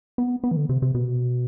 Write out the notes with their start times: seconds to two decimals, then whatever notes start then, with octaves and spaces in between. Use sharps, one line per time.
0.18 B3
0.44 B3
0.51 E3
0.57 D3
0.69 C3
0.82 C3
0.95 B2